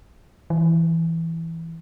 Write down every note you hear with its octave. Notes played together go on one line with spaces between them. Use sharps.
E3